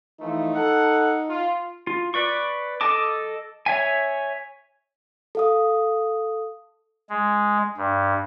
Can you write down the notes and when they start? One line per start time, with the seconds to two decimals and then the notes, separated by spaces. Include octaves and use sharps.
0.20 E3 F3 A3 D#4
0.55 A4 F#5
1.29 F4
1.87 F4
2.14 B4 D5 C#6
2.81 A4 D#5 A5 D6
3.66 C#5 E5 G#5
5.35 A4 F5 D#6
7.09 G#3
7.77 G2